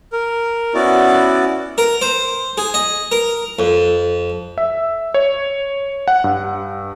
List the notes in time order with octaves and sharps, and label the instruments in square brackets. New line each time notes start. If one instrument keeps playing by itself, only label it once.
[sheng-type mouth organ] A#4
B3 C#4 E4 F#4 D5
[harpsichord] A#4
C5
G#4
D#5
A#4
F2
[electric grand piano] E5
C#5
F#5
G2